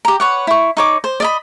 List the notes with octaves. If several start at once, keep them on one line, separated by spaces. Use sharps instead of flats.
G4 A#5
B4 C#5 F#5
E4 C#6
D#4 C#5 D6
C5
D5 D#5 B5